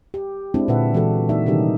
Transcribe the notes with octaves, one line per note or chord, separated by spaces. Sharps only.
G4
G#3 C4 D4 E4
A#2 D3 B4 E5 F#5
E3 G#3 F#4 A4
A#3 D#4 D5 E5
C3 D#3 G3 C#4 D#4 G4